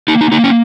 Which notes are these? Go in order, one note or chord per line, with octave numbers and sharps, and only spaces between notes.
A#3 D#4
D#4
A#3 D#4
C#4